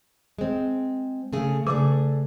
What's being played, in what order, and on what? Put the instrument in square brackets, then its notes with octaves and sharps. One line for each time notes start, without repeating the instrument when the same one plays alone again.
[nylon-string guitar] G#3 C4
C#3 A3 G#4
[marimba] C#3 [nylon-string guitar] A3 D4 G#4